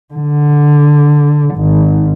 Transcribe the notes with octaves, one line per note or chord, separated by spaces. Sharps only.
D3
G#1